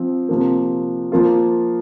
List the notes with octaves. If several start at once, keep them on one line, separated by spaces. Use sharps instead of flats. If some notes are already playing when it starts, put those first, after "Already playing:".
Already playing: F3 C4
C3 F3 A#3
F3 A#3 F4